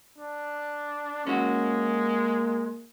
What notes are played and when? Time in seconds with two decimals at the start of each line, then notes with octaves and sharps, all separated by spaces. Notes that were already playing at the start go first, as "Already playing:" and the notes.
0.18 D4
1.27 G#3 A#3 C#4 E4 F#4